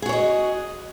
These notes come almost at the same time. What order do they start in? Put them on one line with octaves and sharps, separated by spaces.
G#4 F#4 C#5 D#5